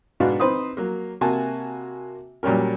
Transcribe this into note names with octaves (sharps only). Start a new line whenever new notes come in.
G#2 B2 B3 D4 F#4 F5
C4 D#4 B4 C5 D#6
F#3 A#3
C3 A#3 F#4 G#5 A5
A#2 F#3 G3 C#4 A#4